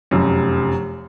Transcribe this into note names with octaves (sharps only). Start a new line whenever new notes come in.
F1 F#2